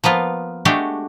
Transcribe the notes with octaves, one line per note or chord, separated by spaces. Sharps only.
F3 A#3 B3 F4
G#3 A3 D4 F#4 G4